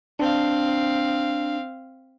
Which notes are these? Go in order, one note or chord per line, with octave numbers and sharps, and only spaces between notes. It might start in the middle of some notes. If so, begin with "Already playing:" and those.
C4 D4 F5